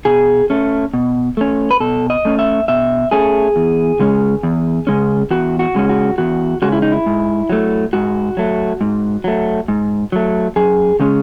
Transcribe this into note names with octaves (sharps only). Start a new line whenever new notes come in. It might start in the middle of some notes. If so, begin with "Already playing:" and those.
B2 G#4
A3 C#4
B2
A3 C#4
B4
B2 A4
D#5
A3 C#4
E5
B2 E5
A3 C#4 G#4
E2
C#3 G#3 C#4
E2
C#3 G#3 C#4
E2 F#4
F#4
C#3 G#3 C#4
F#4
E2 F#4
C#3 G#3 C#4 F#4
E4
D#4
E4
G#2
F#3 A3
G#2 F#4
F#3 A3
G#2
F#3 A3
G#2
F#3 A3
F#2 G#4
C#3 G#3 C#4